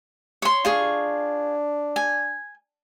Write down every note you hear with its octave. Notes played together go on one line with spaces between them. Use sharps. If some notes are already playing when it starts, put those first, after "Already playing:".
C#5 C6
D4 F4 G#4 C#6
G#5